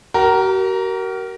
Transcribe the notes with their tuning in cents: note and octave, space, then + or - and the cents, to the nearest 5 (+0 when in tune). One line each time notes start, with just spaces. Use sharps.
F#4 +45 A#4 +0